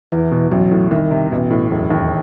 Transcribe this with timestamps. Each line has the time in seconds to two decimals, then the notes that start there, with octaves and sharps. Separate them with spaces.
0.12 E2 E3
0.32 B2
0.51 A1 F#3
0.71 A2
0.91 C2 D#3
1.11 C3
1.31 A1 B2
1.51 A2
1.71 E1 F#2
1.90 D#2